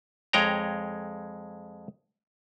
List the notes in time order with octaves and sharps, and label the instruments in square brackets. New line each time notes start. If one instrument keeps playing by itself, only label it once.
[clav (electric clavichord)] F2 G#3 C#5 G5 A#5